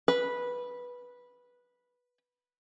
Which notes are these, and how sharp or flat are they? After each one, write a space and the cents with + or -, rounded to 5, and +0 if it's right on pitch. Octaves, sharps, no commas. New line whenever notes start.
B4 -10